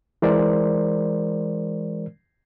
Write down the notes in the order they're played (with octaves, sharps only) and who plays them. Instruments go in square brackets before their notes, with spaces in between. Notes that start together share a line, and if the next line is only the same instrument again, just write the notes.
[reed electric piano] E3 G#3 A#4 C5 D5